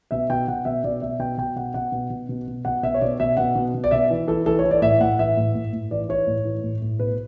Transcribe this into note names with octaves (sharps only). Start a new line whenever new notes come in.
B2 E5
B2 G5
B2 F#5
B2 E5
B2 D5
B2 E5
B2 G5
B2 G5
B2 F#5
B2 F#5
B2
B2
B2
B2
B2 F#5
B2 E5
C#5
B2 D5
B2 E5
B2 F#5
B2
B2
D5
B2 E5
E3
E3 A4
E3 A4
C#5
E3
D5
A2 E5
A2 F#5
E3 E5
A2
A2
A2
E3 D5
E3 C#5
A2
E3
A2
A2
B2 B4